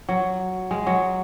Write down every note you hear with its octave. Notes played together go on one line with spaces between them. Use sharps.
F#3
G#3
F#3